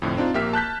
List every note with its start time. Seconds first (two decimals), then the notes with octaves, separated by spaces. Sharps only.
0.02 F2 A2 D3
0.17 C4 D4 D#4 F4
0.34 A#1 A#3 G4 E5 F6 B6
0.53 A5 F#6 G6 B6